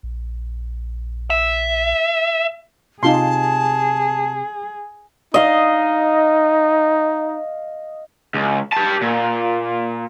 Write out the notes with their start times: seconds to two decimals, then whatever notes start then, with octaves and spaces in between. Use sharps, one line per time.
0.03 A#1
1.30 E5
3.03 C3 D#4 F4 G#4 A5 C6
5.34 D#4 D#5 F5
8.34 C#2
8.73 G4 A5
9.01 A#2